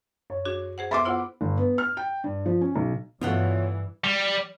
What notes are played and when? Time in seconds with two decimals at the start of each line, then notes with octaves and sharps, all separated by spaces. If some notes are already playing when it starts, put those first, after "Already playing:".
0.30 F#2 C#5
0.45 D4 F#4 G#4
0.78 G#4 C5 F#5
0.91 B3 A4 B4 E5 B5 C6 D6
1.05 B3 E4 F4 C5 F#5
1.41 G1
1.57 B3
1.78 F6
1.97 G5
2.24 G2
2.46 F3
2.61 C#4
2.76 B1
3.21 G2 B2 E3 A3 F4 C#5 F#5
4.04 G3